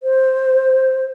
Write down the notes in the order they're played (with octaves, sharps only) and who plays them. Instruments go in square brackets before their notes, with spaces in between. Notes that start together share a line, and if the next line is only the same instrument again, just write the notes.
[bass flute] C5